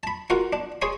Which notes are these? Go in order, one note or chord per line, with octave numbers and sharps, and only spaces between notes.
A5 B5
F4 F#4 A#4 F#5
D4
G#4 C#5 G#5 C6